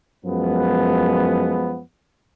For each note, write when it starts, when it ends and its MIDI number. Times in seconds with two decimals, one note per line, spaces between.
0.25 1.82 42
0.25 1.82 53
0.25 1.82 56
0.25 1.82 59